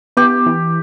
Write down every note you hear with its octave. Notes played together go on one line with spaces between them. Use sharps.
B3 G4
E3